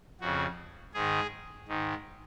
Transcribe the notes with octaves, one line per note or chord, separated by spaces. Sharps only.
F2 C#3 F#4
G#2 D#3 G#4
G#2 D#3